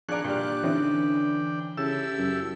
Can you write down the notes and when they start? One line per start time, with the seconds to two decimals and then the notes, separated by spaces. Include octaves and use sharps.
0.09 F3 D4 G#4 D5 A#5 C#6 F#6
0.24 A#2 G3 D4 G5 F6
0.63 D3 E3 C4 C#4 D#4
1.77 C#3 E4 G4 A4 E6
2.18 F#2